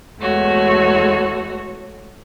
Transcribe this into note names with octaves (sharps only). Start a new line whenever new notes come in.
E2 G#3 A3 F#4 C#5